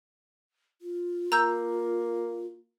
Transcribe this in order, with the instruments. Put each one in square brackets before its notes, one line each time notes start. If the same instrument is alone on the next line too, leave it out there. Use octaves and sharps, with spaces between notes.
[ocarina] F4
[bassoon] A#3 [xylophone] A#5 E6 G6